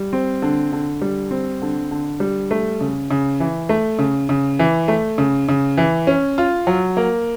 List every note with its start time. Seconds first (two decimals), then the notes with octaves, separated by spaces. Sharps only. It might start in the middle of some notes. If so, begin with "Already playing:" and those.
Already playing: G3
0.13 C4
0.42 D3
0.72 D3
1.02 G3
1.31 C4
1.62 D3
1.91 D3
2.20 G3
2.51 A3
2.81 C#3
3.11 C#3
3.40 E3
3.69 A3
3.99 C#3
4.29 C#3
4.59 E3
4.88 A3
5.18 C#3
5.49 C#3
5.77 E3
6.07 C#4
6.38 F4
6.67 F#3
6.97 A#3